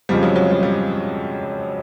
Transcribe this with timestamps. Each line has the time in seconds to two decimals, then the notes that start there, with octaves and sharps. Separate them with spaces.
0.09 F2 C#3 F3 G3 G#3
0.23 F#3
0.36 F#3
0.50 G3
0.63 G3